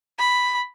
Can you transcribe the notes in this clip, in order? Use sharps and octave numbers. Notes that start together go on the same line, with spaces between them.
B5